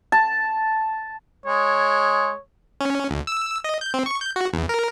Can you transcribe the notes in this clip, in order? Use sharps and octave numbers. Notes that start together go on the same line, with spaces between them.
A5
G#3 C#5
C#4
D2
E6
D#5
G6
C4
C#6
G6
F#4
E2
A#4